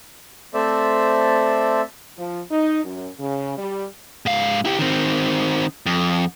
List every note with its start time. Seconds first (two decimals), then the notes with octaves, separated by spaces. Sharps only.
0.54 A3 C4 A4 C5 D5 E5
2.18 F3
2.51 D#4
2.85 F#2
3.19 C#3
3.58 G3
4.26 G#2 F5
4.65 E4 G4
4.79 D#3 C4
5.86 F2